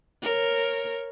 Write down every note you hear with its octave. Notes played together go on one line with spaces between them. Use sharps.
A#4 C#5